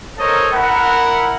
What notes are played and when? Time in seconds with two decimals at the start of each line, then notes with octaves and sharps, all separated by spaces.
0.19 A4 A#4 C5 C#5 D#5
0.53 E4 A#4 F#5